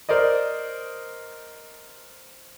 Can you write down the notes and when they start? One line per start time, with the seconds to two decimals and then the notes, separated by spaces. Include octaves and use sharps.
0.09 A#4 C5 D5 D#5